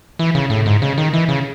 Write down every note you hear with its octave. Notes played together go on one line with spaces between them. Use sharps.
E3
C#3
A2
G#2
C#3
D#3
E3
C#3